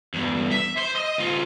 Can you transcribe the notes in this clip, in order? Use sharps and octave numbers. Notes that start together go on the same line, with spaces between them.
E2 G2
E5
C5 C6
D#5
D2 F4